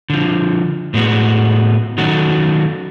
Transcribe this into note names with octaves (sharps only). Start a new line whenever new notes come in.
D3 F3
A2 G#3 B3 F#4
D#3 F#3 C#4 F#4 A4